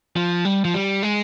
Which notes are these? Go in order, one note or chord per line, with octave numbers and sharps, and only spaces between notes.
F3
G3
F3
G3
G#3